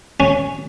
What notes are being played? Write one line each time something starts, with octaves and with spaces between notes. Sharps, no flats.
C#4